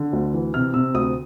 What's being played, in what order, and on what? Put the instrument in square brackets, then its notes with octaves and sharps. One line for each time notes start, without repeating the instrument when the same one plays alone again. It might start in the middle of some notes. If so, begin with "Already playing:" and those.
Already playing: [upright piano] D3
D2
E3
C3 F6
C3 E6
D2 D#6